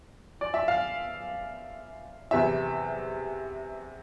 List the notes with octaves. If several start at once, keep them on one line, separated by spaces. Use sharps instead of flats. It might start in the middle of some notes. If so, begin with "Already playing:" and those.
D5
E5
F5
E2 C3 E3 E5